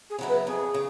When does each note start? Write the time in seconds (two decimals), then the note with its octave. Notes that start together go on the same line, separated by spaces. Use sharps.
0.10 G#4
0.18 C#3 F#3 B3 E4
0.28 B4
0.47 F2 G#4
0.74 C#3